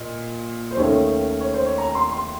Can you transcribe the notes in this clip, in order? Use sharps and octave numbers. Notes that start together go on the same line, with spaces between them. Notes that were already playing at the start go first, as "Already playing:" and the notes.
Already playing: A#2 D#5
C5
D#2 D#3 A3 C#4 C#5
C#5
C5
C#5
A#5
C6
C6